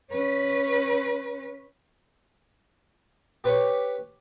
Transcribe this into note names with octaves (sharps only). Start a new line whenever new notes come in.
C#4 B4
G4 B4 C#5